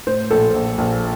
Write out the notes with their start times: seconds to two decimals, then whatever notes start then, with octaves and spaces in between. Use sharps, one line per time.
0.07 A2 C5
0.30 A#1 A4
0.54 A#1
0.78 A#1